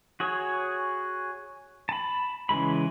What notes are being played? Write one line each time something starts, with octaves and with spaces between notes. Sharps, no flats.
F#4 G#4 C#5
A5 B5
C#3 E3 G#3 B5